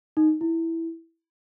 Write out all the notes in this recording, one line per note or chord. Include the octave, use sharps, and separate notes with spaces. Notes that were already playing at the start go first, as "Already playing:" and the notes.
D#4
E4